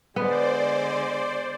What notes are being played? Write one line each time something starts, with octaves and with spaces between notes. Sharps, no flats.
D3 G#3 B3 C5 D5